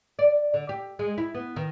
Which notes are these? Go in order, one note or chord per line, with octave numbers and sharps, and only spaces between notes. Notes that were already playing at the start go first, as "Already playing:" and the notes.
D5
D3
G4
G#3
E4
B3
D#3